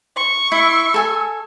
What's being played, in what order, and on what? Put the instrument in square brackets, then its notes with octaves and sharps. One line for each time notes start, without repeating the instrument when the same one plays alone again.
[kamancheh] C#6
[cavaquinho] E4 [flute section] E6
[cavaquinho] A4 G#5